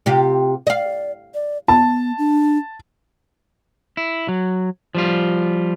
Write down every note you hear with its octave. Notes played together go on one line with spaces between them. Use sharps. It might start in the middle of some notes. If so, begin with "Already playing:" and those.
C3 F4 G4
D5 D#5 F5
D5
B3 A5
D4
E4
F#3
F3 G3 F4